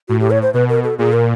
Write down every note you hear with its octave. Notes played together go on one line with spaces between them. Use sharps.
A2 F#4
G4
C#5
C5
B2 B4
A#4
A4
A#2 G#4
A#4